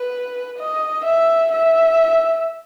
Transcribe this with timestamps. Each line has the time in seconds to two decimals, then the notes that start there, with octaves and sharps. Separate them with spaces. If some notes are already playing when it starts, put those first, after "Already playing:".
Already playing: B4
0.59 D#5
1.05 E5
1.52 E5